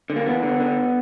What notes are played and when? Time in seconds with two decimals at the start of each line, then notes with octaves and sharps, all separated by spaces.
0.10 D3
0.16 A#3
0.26 E2 B3
0.43 D3
0.60 D3